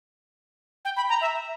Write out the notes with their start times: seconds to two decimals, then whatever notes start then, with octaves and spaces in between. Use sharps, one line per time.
0.85 G5
0.97 B5
1.09 A#5
1.21 E5